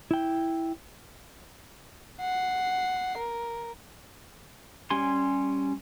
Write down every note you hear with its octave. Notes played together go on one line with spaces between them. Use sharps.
E4 G5
F#5 C7
A#4
G3 C#4 G4 G#5 C6